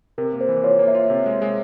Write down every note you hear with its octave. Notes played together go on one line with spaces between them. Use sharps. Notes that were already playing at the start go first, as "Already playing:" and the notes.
C3 A#4
A#3
C5
E3
F4 C#5
A#3
E5
F4
C3
G#3
G#3